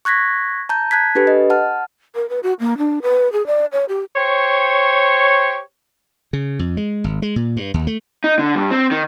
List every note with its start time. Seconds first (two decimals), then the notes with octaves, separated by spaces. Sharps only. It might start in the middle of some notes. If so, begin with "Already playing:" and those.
0.05 C#6 F#6 G#6 A#6 B6
0.69 A5 A#5 G6
0.91 A5 F#6 G#6 B6
1.15 D4 G4 A4 B4
1.27 D#5
1.50 F#5 A5 F6
2.15 A#4
2.29 B4
2.43 F#4
2.60 A#3
2.78 D4
3.02 B4
3.33 G#4
3.47 D5
3.72 C#5
3.89 G4
4.16 G4 C5 C#5
6.33 C#3
6.59 F2
6.77 G#3
7.04 G#1
7.22 G#3
7.36 A#2
7.57 G2
7.74 D#2
7.87 A3
8.24 D#4
8.39 D3
8.55 G2
8.71 C4
8.91 D#3